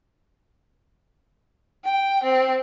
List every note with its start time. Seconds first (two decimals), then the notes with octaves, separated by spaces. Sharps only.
1.84 G5
2.24 C4